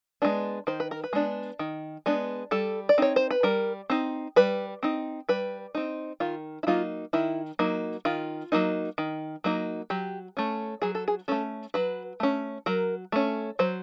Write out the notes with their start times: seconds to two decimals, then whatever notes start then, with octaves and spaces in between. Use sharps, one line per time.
0.22 G#3 B3 D4
0.67 D#3 C5
0.80 B4
0.91 A#4
1.04 B4
1.13 G#3 B3 D4
1.59 D#3
2.06 G#3 B3 D4
2.51 G3 A4
2.89 D5
2.98 C4 D#4 C#5
3.16 C5
3.31 B4
3.43 G3 A#4
3.90 C4 D#4
4.36 G3 B4
4.83 C4 D#4
5.29 G3 B4
5.75 C4 D#4
6.20 D#3 F4
6.63 E4
6.67 F#3 A#3 D#4 F4
7.13 D#3 E4
7.59 F#3 A#3 D#4
8.05 D#3 F4
8.52 F#3 A#3 D#4
8.98 D#3
9.44 F#3 A#3 D#4
9.90 F#3 G4
10.37 A3 C#4
10.82 F#3 G#4
10.95 A4
11.08 G#4
11.28 A3 C#4 A4
11.74 F#3 B4
12.20 A3 C#4
12.66 F#3 A#4
13.12 A3 C#4
13.59 F#3 C5